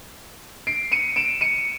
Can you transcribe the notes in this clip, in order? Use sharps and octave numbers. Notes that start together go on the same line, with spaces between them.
C7 D7
C#7 D#7
D7 E7
C#7 D#7